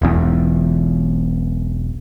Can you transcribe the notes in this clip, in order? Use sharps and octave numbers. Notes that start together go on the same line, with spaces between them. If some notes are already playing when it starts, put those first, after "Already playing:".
E1 B1 E2